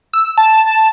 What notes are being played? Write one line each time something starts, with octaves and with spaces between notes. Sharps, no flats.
E6
A5